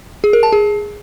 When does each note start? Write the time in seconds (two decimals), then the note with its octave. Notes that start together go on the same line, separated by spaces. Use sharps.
0.24 G#4
0.33 A#4
0.43 A5
0.53 G#4